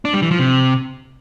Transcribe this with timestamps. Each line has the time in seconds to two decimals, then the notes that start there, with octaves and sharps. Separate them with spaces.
0.05 D4
0.14 G3
0.22 E3
0.31 F3
0.39 C3